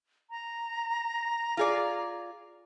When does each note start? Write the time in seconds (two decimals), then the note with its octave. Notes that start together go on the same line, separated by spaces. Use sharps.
0.30 A#5
1.57 F4 G#4 D5